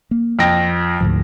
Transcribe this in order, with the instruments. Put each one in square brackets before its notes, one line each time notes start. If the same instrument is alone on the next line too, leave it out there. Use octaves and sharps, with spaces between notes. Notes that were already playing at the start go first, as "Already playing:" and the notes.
[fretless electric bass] A#3
[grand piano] F2 G5 A#6
[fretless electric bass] D2 G#2 F3